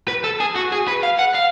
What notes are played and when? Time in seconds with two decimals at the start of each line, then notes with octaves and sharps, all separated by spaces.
0.08 B4
0.24 A4
0.40 G#4
0.55 F#4
0.72 G#4
0.88 B4
1.03 F5
1.19 F#5
1.34 F5